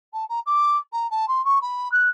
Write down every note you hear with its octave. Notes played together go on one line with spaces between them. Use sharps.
A5
A#5
D6
A#5
A5
C6
C#6
B5
F#6